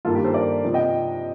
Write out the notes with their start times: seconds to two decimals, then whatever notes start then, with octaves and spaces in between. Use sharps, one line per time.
0.05 G2 D#3 A#3 F4 A4
0.15 G4
0.24 A4 C5
0.34 A#4 D5
0.64 C3 F3 C4
0.74 D#5 G5